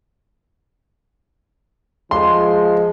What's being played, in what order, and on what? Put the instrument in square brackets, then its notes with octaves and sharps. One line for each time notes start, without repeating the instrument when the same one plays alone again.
[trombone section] F3 G#3 [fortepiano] C6